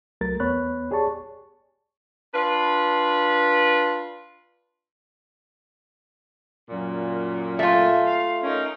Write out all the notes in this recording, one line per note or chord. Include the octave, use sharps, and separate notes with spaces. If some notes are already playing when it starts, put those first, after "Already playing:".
C2 F#3 A3 A#4 A6
E2 B3 C#5 B5 F#6
G4 G#4 C#5 D5 A5 C#6
D4 F4 B4
F#2 A#2
A3 F4 E5 G#5
F5
C#4 D#4 A#4